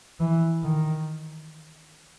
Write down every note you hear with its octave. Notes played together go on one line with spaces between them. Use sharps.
E3
D#3